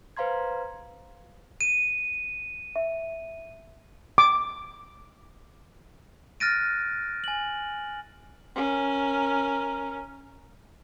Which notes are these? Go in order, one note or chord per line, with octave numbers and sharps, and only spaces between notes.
B4 C5 F5 A#5 C6 G#6
D#7
E5
D6
F6 F#6 A6 A#6 D7 D#7
G#5 F#7
C#4 A#4